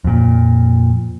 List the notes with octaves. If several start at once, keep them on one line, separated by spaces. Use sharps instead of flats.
F2 A#2